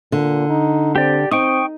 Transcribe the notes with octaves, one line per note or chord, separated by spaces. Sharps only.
A#2 D3
D#4
C4 G4 D5
C4 D#4 G5 C#6 D#6